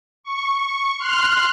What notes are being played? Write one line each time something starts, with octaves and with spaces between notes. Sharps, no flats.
C#6
C6 F6 F#6